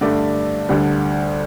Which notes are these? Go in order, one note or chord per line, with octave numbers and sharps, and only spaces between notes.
G2 D3 A3 D5
D2 D3 G3